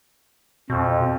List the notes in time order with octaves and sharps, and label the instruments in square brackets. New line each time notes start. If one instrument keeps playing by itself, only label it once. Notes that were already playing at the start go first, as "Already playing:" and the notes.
[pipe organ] F2 [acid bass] B2